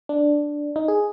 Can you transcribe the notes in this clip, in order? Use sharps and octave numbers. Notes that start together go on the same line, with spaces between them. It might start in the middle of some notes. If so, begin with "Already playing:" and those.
D4
D#4
G#4